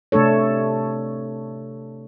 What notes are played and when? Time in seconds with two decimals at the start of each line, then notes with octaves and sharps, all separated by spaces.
0.12 C3 A3 D4 A4 C#5